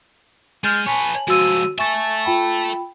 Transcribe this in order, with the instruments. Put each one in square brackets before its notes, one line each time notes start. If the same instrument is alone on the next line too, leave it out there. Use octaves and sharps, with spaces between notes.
[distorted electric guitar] G#3 [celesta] F6 G6 A6
[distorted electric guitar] B4 C#5 [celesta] G#5 A5
[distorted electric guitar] F3 G#3 [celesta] F#4 E6 D#7
[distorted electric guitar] A4 E5 [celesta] G#5 C#6 A6
[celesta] F4 G5 B5